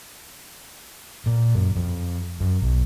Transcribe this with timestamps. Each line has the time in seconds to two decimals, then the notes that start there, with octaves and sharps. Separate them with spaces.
1.26 A#2
1.55 F#2
1.76 F2
2.40 F#2
2.62 B1